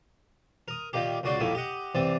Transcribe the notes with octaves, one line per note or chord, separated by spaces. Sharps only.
A#4 D#6
A#2 D#3 A#3 G4
C#2 A#2 C#3 F#4 D5 C6
A#1 A2 D#3 A#3 E4
G4 D#5 F#5
C2 E3 C4 D5